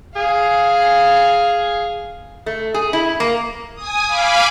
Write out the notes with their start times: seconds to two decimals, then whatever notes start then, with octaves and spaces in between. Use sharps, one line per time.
0.16 G#4 F5
2.46 A3
2.74 G#4
2.93 E4
3.20 A#3
3.74 G#5 D#6
4.07 F5 G#5 B5 D6